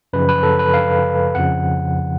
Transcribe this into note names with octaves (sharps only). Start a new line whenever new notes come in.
F#2 C#3 F3 B4
B4
A4
B4
F5
F2 C#3 F3 F#5